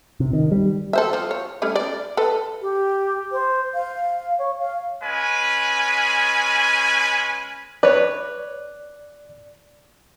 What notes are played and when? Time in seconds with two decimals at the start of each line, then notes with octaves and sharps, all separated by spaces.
0.20 C3
0.33 D#3
0.52 G3
0.93 A4 C5 E5
1.13 F3
1.31 C#5
1.62 G3 A3 C#4
1.76 D5
2.17 A4 B4
2.61 G4
3.32 C5
3.74 F5
4.39 C#5
4.59 F5
5.03 G#3 C#4 B4 G#5
7.83 B4 C#5 D5